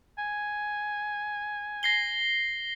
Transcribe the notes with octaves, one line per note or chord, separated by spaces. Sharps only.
G#5
A#6 C7 G7